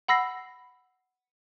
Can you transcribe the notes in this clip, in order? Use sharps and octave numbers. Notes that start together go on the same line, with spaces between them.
F#5 B5 E6 A#6 C7